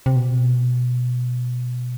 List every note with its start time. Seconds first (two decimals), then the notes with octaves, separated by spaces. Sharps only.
0.06 C3
0.16 B2